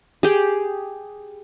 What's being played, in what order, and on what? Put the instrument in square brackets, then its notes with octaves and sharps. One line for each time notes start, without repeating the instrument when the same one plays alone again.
[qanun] G4 G#4